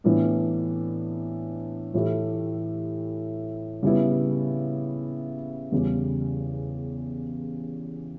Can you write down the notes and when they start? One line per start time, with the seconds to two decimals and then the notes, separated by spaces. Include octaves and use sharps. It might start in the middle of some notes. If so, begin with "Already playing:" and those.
0.04 A2 E3 B3 D4
1.94 A2 E3 A3 E4 G4
3.83 C#3 G3 B3 E4
5.72 E2 C#3 G3